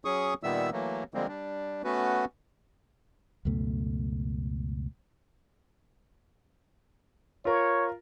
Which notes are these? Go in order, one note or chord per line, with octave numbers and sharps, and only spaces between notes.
F#3 C#4 G#4 C#6 D#6
A#2 D#3 G3 B3 E5 E6
E3 F#3 A3 A#3
D3 F3 G3 G#3 A#3 C4
G3 D4
A3 B3 C#4 F#4 B4
C#2 F#2 B2 A3
F4 A#4 C#5